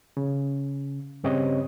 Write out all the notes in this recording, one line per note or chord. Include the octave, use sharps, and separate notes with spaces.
C#3
G2 C#3 C4 G4 C#5 D#5